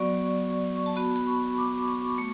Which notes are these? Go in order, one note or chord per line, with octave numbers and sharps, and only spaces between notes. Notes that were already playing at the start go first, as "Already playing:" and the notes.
Already playing: F#3 B3 F#4 D5 C#6
C#6
C#6
A5
B3 F#4 B5
B5
C#6
D6
C#6
A3